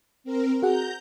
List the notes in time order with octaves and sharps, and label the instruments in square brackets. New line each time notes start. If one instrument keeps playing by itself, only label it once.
[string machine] C4 A#4
[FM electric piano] F#4 G#4 F#5 [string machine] A#5 G6